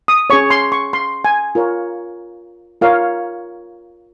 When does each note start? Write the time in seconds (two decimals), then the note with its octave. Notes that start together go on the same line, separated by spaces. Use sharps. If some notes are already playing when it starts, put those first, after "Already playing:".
0.08 D#6
0.30 C#4 G#4 C#5 C#6
0.50 C6
0.72 C#6
0.93 C6
1.25 G#5
1.55 F4 A#4 C#5
2.81 F4 A#4 C#5 F5